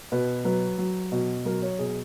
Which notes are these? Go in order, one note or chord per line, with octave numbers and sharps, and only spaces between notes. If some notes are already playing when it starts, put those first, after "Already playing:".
B2 B4
F#3 B4
F#3
B2
F#3 A#4
C#5
B2 G#4